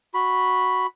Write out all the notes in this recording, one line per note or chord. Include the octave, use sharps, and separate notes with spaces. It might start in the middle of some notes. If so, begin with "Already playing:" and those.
F#4 B5